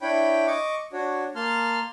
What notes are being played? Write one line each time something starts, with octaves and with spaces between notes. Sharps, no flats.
D4 E4 C#5 G5 B5
D#5 C#6 D6
D4 F#4 C#5
A#3 A5 C6 F6